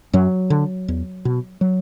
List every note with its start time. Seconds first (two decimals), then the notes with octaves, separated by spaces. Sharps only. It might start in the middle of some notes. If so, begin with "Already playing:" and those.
0.13 F#2 F#3
0.50 D3
0.88 E2
1.25 B2
1.61 F#3